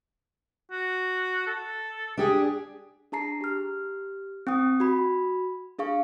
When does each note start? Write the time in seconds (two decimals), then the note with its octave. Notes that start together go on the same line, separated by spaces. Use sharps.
0.71 F#4
1.47 A4
2.17 D4 G4 G#4
3.12 D4 G#4 A5 A#5 C7
3.41 G4 F6
4.47 C4 G5 D#6
4.80 F#4 B5
5.79 D4 G#4 F5 C#6